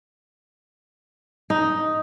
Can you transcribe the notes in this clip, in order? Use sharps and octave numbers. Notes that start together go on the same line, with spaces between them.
D#4